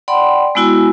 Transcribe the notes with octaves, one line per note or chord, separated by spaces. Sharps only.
D5 F#5 G5 B5 C6
G#3 B3 E4 F#4 G#5